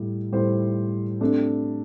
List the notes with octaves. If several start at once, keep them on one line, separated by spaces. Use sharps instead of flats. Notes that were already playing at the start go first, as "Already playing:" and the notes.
Already playing: A2 G3 E4
A2 G3 E4 C5
C3 A3 D4